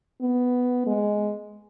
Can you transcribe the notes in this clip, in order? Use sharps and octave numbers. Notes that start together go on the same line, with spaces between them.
B3
G#3